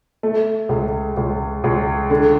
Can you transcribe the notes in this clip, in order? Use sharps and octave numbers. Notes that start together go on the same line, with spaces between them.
A3
C#2
C#2
C#2
D3